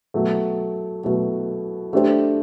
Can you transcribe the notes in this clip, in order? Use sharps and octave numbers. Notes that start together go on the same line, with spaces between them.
B2 F#3 A3
B2 F#3 A3
A3 D4 G4 C5